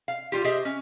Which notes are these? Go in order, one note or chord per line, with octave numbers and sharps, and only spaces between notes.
F5
G3 F4 G4
G4 G#4 C5 D#5 E5
C#4